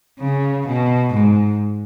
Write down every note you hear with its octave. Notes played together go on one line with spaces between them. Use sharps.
C#3
B2
G#2